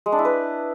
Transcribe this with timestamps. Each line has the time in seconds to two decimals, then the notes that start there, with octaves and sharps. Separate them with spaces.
0.06 G#3
0.12 D4
0.19 E4
0.25 B4